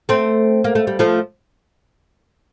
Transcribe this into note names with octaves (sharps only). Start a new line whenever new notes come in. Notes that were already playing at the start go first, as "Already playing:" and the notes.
A3 C4
A#3
A3
G3
F3 A3